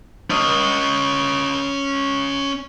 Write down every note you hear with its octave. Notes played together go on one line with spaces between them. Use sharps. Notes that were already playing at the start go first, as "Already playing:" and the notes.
C#4 D#5